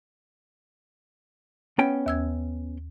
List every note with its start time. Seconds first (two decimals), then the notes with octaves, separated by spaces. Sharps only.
1.79 B3 C#4 G5
2.06 D#2 E6 G#6